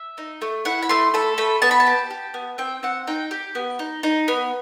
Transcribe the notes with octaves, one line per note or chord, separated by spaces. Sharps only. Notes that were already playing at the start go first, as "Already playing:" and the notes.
Already playing: E5
D#4
A3
E4 F#5
B5
A3 C6
A4 B5
A3 B5
B3 A5
B5
A5
G4
G4
B3
C4 G5
C4 F#5
D#4 G5
G4
B3
D#4
D#4
B3